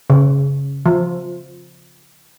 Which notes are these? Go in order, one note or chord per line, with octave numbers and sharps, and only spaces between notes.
C#3
F3